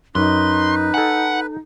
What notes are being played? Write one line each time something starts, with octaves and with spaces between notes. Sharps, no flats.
F#2 D#4 B4 C6
A4 F#5 G#5